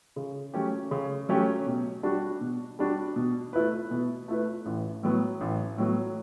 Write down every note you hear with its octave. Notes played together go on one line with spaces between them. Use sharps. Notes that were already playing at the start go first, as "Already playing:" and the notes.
C#3
F#3 A3 C#4 G4
C#3
F#3 A3 C#4 G4
B2
G3 D4 F#4
B2
G3 D4 F#4
B2
A3 E4 B4
B2
A3 E4 B4
A1
A2 F#3 B3
A1
A2 F#3 B3